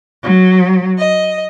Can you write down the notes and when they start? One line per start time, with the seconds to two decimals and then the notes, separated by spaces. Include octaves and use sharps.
0.24 F#3
0.98 D#5